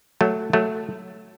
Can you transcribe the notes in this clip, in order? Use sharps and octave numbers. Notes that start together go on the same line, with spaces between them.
F#3 A3
F#3 A3